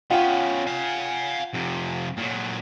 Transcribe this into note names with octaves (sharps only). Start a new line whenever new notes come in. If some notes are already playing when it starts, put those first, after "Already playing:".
B3 C#4 F4 F#5 G5
F5 G#5
F2 C3
A#2 F#3